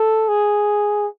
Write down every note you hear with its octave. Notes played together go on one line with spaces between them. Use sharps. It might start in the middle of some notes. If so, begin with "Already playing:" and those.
Already playing: A4
G#4